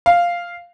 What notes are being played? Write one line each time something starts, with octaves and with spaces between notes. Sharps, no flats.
F5